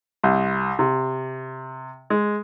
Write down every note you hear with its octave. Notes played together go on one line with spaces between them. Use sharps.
C2
C3
G#3